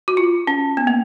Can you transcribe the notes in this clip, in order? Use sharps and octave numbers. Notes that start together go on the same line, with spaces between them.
F#4
F4
C#4
B3
A#3